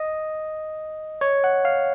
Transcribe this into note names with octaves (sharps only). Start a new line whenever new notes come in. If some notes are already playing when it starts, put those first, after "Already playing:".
Already playing: D#5
C#5
F#5
F5